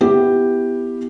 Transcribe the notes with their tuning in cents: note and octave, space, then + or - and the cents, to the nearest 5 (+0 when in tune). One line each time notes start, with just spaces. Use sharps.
B3 +10 E4 +0 G4 +5